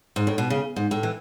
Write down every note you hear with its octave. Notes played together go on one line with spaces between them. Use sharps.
G#2
A2
B2
C#3
G#2
A2
E3